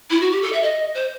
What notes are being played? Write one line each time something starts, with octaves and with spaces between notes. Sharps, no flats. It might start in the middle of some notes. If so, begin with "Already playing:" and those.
E4
F#4
G4
A4
E5
D#5
C5